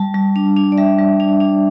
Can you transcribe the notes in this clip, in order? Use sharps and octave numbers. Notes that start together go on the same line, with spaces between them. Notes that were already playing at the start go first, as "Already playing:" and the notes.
Already playing: G3 A5
G3
D4
D4
D5
G3 E5
G3
D4
D4